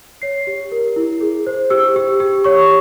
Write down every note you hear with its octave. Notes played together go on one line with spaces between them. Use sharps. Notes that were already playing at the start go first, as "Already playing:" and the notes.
C#5 C7
G4
A#4
E4
G#4
C5
G4 E6
G4
G4
C#5 C#6